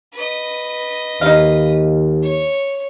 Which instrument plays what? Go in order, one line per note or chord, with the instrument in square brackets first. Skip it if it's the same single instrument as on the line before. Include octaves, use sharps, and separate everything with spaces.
[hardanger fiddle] B4 D#5
[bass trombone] D#2 [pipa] D#4 F5
[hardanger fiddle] C#5